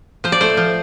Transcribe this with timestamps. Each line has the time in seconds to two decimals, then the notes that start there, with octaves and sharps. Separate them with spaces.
0.24 F3 C5
0.32 D5
0.41 A3 C5
0.57 F3